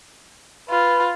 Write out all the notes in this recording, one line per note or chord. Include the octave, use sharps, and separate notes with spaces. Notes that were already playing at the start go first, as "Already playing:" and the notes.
F4 B4